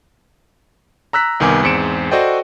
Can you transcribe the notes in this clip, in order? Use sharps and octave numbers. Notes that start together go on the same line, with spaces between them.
A#5 E6 F#6 B6
G1 C2 D#3 B3 G#5 D6
E2 G#2 C4 C#7 D7 E7
F#4 A4 C5 D5 D#5 G5